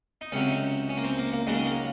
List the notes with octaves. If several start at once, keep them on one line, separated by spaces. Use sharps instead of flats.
D#4
C#2 C3 F#3 C#4
D#4
C#4
A#3
C4
A#3
A#3
D#2 C#3 F#3 G#3
A#3